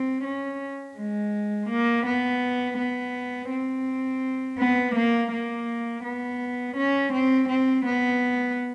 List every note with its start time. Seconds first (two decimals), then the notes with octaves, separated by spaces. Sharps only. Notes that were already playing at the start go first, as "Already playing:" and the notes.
Already playing: C4
0.24 C#4
0.97 G#3
1.69 A#3
2.06 B3
2.78 B3
3.50 C4
4.59 B3
4.95 A#3
5.32 A#3
6.04 B3
6.77 C#4
7.13 C4
7.49 C4
7.86 B3